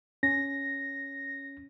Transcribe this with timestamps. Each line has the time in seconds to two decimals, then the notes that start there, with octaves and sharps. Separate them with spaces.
0.23 C#4 A#6